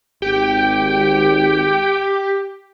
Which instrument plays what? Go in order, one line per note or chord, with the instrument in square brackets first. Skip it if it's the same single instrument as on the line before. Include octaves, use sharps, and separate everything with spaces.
[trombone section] G#1 [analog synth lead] G4 [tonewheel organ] G5